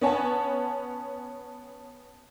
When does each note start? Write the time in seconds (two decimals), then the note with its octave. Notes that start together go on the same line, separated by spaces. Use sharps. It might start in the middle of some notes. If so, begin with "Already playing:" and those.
0.01 B3 C#4 C#5 G#5 A5